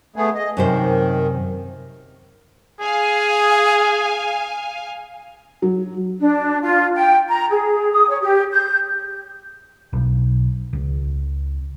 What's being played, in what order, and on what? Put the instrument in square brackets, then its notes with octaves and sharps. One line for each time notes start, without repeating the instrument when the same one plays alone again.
[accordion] A3 B3 G#4
D#5
[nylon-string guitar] F#2 C3 C5 [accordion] D#3
[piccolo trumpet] G#4 [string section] F5 G#5
[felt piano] F#3
[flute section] D4
F4
G5
A#5
G#4
D#6
C#5
G4
G6
[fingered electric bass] B1
C#2